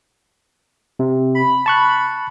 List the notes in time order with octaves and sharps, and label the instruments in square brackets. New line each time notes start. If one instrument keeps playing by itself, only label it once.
[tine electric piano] C3
[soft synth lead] B5
[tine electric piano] A5 C#6 F#6